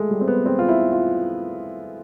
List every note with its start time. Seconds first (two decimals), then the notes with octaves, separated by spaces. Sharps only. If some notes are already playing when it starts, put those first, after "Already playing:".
Already playing: G#3 A3
0.11 G3
0.21 C4
0.28 B3
0.46 C4
0.59 F4
0.69 E4
0.92 F4